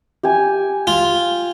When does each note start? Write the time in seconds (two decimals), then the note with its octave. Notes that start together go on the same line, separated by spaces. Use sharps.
0.23 G4 G#5
0.87 F4